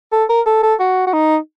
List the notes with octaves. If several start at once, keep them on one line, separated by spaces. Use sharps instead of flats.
A4
A#4
A4
A4
F#4
F#4
D#4